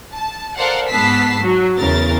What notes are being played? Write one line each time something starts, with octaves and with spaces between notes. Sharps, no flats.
A5
A4 A#4 C5 D5 F5 F#5
G#2 B3 A5 E6 B6 C7
F#3
E2 C#3 A#4 A6